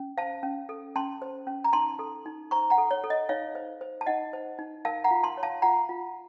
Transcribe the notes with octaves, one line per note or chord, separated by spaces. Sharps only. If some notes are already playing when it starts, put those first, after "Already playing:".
Already playing: C#4
C5 F5 A5
C#4
A4
C#4 A5 C6
C5
C#4
A#5
D#4 A5 C6
A4
D#4
C5 A#5 C#6
F#5 A#5
A4
C#5
A4
D#5
D#4 C#5 F5
C5
C5
A5
D#4 D#5 F#5
C5
D#4
A#4 F5 A5
F#5 A#5
F4
A5 C6
C#5
F5 A5
F4 F#5 A#5
F4